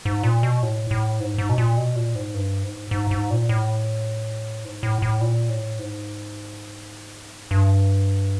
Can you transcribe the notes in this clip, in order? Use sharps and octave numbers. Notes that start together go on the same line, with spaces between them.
G#2
A#2
B2
A2
A2
G#2
G#2
B2
A#2
B2
A#2
G#2
G2
G#2
G#2
G#2
A#2
A2
G#2
A2
A2
A#2
A2
G#2
G2